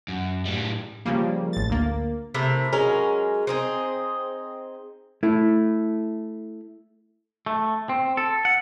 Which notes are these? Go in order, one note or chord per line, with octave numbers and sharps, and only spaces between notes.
F#2
A2 G3
C#3 F3 G3 A#3
A1 A6
D2 A#3
C3 A3 E4 A#4
F#3 G#3 C#4 A#4
C4 D#4 G#4
A3 E4
A3
C4
A4
F#5